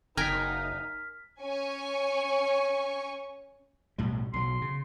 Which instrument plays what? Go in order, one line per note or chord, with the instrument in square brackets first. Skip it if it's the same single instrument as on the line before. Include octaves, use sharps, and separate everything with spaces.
[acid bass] F#1 [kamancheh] D#4 [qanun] A#4 G5 G#5 [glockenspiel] F6 B6
[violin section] C#4 G#5 C#6
[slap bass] B1 A2 G3
[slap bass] B1 F#3 [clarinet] C6
[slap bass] C#3